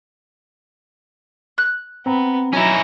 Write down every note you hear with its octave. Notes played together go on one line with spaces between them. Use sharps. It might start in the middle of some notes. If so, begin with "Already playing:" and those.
F#6
B3 C4 A#5
F#3 C#4 D#4 E4 A#5